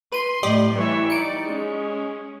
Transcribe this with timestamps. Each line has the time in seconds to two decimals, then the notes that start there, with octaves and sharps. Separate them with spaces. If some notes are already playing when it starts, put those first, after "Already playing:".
0.12 B4 C6 D#7
0.43 A2 G4 D5 D#5
0.76 E3 G3 C#5 E5
1.10 D#4 D5 C#7 D7
1.46 G#3 C#4